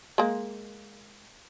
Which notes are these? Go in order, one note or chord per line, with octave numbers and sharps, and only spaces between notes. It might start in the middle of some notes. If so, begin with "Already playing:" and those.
G#3 A#3